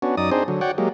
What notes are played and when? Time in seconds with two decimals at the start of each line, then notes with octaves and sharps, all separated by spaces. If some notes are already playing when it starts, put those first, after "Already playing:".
0.02 B3 C#4 D4 F#4
0.17 F#2 D#4 D5 D#6
0.31 C4 D4 D#4 G#4 C5
0.48 D3 F#3
0.61 F#4 C#5 D5 F#5 G5
0.78 F#3 G#3 A#3 G4